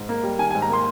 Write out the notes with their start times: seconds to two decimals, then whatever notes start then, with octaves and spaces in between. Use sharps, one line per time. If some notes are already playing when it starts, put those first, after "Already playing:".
Already playing: G#2
0.09 A#3
0.24 G3
0.39 D#3 G#5
0.51 G#5
0.55 G#2
0.62 A#5
0.69 A#3 C6